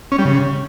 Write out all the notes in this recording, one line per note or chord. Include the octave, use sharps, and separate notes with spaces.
C#4
G3
C#3